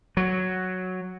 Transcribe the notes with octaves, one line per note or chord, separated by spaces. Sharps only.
F#3